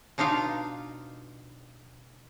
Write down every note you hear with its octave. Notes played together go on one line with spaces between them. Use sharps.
B2 D4 D#4 F4 F5